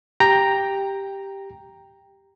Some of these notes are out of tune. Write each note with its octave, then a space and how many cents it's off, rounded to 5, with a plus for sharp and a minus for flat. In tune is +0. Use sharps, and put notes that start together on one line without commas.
G4 +0 G5 +10 A#5 +0